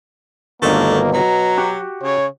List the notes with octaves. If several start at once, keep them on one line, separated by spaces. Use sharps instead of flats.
G1 B2 D3 D#3 A3 A#3
F#3 A#5
F#4 G4 F#5
C#3 C#5